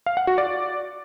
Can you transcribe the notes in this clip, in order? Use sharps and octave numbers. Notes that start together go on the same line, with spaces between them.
F5
F#5
F#4
D5